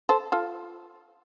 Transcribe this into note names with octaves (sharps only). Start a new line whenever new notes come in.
A4 C5
F4 A4